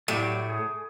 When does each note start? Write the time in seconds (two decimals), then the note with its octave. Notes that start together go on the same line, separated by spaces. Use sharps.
0.08 A2 F#3 G4 D5
0.50 G#4